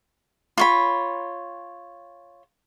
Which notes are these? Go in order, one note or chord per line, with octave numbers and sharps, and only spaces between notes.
F4 C#5 B5